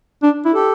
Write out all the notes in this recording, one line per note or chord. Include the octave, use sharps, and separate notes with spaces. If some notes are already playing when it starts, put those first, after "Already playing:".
D4
E4
G4 A4